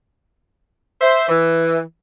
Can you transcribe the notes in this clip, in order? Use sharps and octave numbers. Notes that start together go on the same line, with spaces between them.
C5 E5
E3